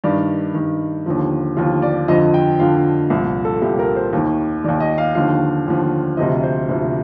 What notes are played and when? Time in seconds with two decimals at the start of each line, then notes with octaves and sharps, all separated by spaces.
0.04 G2 D#3 D5
0.54 G2 D#3
1.06 D#2 D3 F3
1.57 D#2 D3 F3 F4
1.82 D5
2.08 F2 D3 F3 D#5
2.34 G5
2.59 F2 D3 F3 F5
3.10 C2 A#2 F3
3.45 A4
3.62 C2 A#2 F3 G4
3.79 A#4
3.96 C5
4.13 D#2 D#3
4.64 D#2 D#3 D5
4.80 D#5
4.98 F5
5.15 D#2 D3 F3 F5
5.66 D#2 D3 F3
6.17 D2 C3 F3 D#5
6.43 C5
6.69 D2 C3 F3